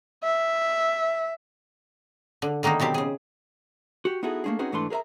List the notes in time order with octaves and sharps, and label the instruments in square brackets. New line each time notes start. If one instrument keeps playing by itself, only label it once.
[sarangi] E5
[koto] D3
D3 D#3 A#3 B3 D#4
B2 F#3 C4 G4
C#3 G#4
[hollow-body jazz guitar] F#4 G4
B3 D#4 E4 F#4 G#4 A4
A3 A#3 C#4 D4 G#4
C4 C#4 D#4 F#4 G#4 B4
G#2 E3 A3 D4 B4 C6
G#4 A#4 B4 E5 A#5